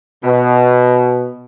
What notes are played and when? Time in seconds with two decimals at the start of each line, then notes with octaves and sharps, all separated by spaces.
0.24 B2